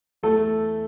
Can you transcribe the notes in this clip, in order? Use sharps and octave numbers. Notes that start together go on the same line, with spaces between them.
E2 A3 A4